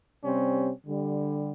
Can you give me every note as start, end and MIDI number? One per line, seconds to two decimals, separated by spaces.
0.24 0.71 48
0.24 0.71 55
0.24 0.71 60
0.24 0.71 61
0.87 1.52 50
0.87 1.52 55